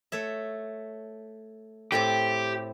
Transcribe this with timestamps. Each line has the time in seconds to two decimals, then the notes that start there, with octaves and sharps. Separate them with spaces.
0.12 A3 C#5 E5
1.92 A2 A3 C4 G4